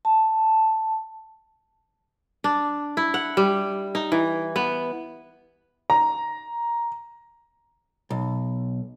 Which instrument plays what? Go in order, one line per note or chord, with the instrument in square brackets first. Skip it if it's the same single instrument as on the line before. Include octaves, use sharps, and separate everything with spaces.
[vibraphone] A5
[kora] D4
E4
F#5
G3
D#4
E3
B3
[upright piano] A#5
[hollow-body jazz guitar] B1